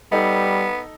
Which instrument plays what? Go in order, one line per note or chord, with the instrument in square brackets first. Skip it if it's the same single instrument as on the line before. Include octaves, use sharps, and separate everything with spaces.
[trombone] G3 [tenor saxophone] B3 [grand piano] D#4 A4